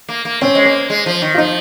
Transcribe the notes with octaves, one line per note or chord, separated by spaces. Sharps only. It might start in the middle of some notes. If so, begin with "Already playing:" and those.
A#3
A#3
C4 C#4
G#3
A#3
G#3
F3
D#3
F4
F3 D#4